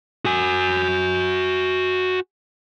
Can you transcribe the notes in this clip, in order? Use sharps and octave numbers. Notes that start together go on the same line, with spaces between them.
F#4 G#5